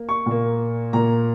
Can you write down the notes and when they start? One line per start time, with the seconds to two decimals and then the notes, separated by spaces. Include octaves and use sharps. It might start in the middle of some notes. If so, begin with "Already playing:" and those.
Already playing: A#3
0.09 C#6
0.26 A#2 A#3
0.93 A#2 A#3 A#5